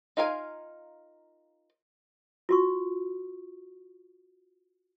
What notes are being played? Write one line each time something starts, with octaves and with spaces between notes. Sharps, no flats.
D#4 F4 A#4 F5 G#5
F4 F#4 C#6